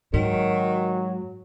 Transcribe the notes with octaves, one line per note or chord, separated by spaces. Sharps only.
G#2 D#3 F#3